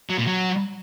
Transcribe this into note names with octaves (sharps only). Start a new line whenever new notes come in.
F#3
A#2
F#3